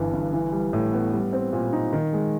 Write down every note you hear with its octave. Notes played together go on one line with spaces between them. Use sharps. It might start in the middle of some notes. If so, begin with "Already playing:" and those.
Already playing: G1 G2 E3
G1
E3
G3
A2
B3
G3
C4
A#2
D#4
D#3
G#3